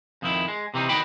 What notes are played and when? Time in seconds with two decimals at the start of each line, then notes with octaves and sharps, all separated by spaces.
0.22 F2 D#3 E4
0.48 G#3
0.74 C3 E3 C4 D#4
0.89 D#3 B3 D#4 F#4 G5 B5